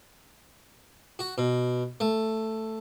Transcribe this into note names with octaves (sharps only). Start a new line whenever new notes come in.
F#4
B2
A3